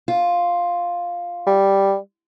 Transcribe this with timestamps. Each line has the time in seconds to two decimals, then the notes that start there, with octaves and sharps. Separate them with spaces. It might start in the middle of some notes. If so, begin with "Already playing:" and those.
0.08 F4
1.47 G3